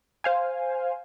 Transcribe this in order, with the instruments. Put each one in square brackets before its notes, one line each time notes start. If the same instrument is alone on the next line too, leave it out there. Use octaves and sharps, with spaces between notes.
[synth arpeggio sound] C5 F5 G#5